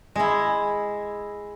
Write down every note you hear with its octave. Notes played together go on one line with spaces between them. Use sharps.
G#3 E4